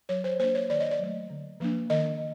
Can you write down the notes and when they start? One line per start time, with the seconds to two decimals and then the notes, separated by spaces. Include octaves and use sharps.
0.09 F#3 C#5
0.24 C5
0.39 A#3 D4 C5
0.55 C#5
0.69 D#3 D5
0.80 D#5
0.91 D5
0.99 F#3 A3
1.30 D3
1.60 F3 A#3 D4
1.90 D#3 D#5